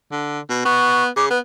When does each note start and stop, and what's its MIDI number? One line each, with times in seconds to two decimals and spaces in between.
0.12 0.39 50
0.50 0.61 47
0.65 1.08 59
0.65 1.03 85
1.16 1.26 49
1.16 1.25 86
1.30 1.39 59
1.30 1.40 71